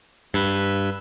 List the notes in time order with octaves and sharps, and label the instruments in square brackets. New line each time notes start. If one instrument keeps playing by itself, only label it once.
[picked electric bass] G2 [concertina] B4 E6